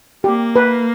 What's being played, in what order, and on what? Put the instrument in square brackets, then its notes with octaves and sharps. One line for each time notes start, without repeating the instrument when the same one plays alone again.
[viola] A#3 [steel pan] G4
[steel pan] B4